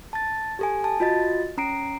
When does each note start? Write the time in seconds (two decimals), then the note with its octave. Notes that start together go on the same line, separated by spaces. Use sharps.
0.13 A5 A6
0.59 G4 A4 G#5
0.84 A5
1.00 F4 F#4 D#5 A6
1.58 C#4 A#5 C7 D7